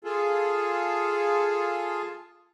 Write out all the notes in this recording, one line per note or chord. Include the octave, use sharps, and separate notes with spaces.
F4 G#4 A4